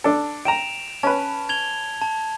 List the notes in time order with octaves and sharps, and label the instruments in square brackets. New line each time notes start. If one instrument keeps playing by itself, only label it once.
[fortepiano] D4 A4
[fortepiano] G5 A#5 [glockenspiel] D7 E7 F7
[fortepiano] C#4 B4 [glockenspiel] A5
[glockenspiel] G#6 F7 G7
A5